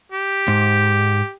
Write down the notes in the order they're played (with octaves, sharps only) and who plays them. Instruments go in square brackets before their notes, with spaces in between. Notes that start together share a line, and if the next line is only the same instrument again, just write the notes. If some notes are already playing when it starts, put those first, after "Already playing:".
[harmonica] G4
[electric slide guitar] G#2